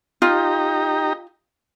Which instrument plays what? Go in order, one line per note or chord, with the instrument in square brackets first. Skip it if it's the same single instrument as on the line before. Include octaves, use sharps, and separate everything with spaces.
[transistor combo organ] D#4 G4 A#5 [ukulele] F4